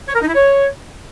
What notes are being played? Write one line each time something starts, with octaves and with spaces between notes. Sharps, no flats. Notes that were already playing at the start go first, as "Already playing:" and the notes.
C#5
A#4
D#4
E4
C#5